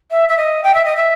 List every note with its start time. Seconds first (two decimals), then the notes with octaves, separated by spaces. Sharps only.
0.11 E5
0.28 E5
0.37 D#5
0.63 G5
0.74 E5
0.85 D#5
0.96 E5